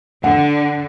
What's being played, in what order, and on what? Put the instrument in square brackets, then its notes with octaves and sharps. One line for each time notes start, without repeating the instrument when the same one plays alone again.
[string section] D3 [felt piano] F#5